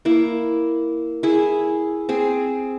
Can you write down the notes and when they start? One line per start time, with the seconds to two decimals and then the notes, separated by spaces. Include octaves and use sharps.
0.05 A#3 E4
1.23 E4 G#4
2.09 C4 G#4